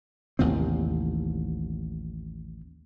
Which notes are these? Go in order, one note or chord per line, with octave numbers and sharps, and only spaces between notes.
A1 D#2 C3 C4